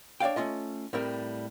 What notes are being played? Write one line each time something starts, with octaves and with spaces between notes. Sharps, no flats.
D4 C#5 D5 F5 G5
A3 C#4 F4 D#5
A2 G3 C4 A#4